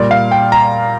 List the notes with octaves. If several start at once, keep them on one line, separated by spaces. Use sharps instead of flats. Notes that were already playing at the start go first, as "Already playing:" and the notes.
Already playing: A#2 G3 D5
F5
G5
A#5